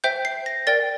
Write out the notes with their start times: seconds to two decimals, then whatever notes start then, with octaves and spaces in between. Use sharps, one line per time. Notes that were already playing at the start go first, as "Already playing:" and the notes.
0.04 C5 E5 G5 G6
0.25 C7
0.46 A#6
0.67 A#4 D5 G5 A6